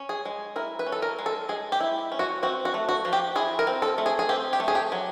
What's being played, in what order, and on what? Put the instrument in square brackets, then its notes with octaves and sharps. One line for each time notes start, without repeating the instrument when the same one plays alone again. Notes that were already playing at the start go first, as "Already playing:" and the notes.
Already playing: [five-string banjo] C#4
G#4
G#3
E4 A#4
B4
C#4
A4
A#4
G#3
A4
G#3 G#4
G4
E4
C#4
F#4
C4 F#4
F#4
A3
F#4
F3
G4
E4 G#4
A#4
C4
A4
A3
G#4
G#4
C4 G4
G4
A3
G#4
G4
F#3